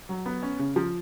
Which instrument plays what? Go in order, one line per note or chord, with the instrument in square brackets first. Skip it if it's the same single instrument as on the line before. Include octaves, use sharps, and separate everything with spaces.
[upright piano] F#3
B3
C#4
C#3
F3